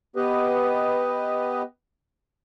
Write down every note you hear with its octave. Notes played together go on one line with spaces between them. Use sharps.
B3 G4 B4 D#5